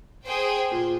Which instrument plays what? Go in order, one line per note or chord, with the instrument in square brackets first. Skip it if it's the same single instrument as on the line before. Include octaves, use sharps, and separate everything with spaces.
[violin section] G#4 C5 G5
[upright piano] A#2